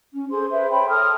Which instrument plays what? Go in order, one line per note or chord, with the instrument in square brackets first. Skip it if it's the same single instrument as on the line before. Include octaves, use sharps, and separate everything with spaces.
[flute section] C#4
G#4 A4 C5 C6
B4 C5 E5
C#5 G5 B5 C6
A4 A5 D#6 F6